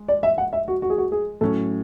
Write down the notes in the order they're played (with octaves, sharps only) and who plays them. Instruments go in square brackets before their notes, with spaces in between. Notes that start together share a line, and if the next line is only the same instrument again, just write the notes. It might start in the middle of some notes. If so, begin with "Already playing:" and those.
Already playing: [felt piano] G#3
[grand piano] D5
E5
F#5
E5
F#4
F#4
G#4
F#4
G#4
[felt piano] A2 F#3 C#4 [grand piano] A4